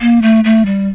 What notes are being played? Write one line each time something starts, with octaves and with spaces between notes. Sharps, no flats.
A#3
A3
A3
G3